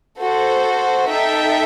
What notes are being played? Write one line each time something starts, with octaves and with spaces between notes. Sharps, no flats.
F#4 A4 C5
D#4 A4 E5 G5